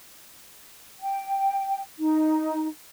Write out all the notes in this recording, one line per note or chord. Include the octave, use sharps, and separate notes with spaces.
G5
D#4